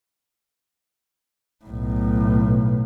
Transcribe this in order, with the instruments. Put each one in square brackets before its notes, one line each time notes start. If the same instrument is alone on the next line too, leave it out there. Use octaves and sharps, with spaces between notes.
[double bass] B1 A2